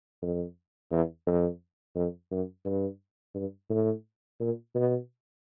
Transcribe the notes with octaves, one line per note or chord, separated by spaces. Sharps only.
F2
E2
F2
F2
F#2
G2
G2
A2
A#2
B2